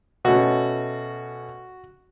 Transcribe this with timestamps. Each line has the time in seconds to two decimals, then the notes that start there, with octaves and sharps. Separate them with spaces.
0.25 B2 A3 C#4 F#4